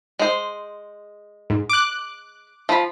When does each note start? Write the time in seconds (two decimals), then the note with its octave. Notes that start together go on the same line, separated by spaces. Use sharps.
0.19 G#3 C5
1.50 G#2
1.69 D6 F#6
2.69 F3 B5